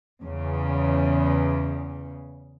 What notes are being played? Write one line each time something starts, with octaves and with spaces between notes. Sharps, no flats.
E2 C#3